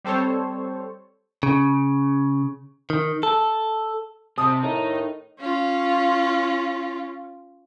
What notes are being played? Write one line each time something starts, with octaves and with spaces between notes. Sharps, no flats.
G3 C4 A4 C5 C#5
C#3
D#3
A4
C3 A5 D#6
A2 D#3 D#4
C#4 F4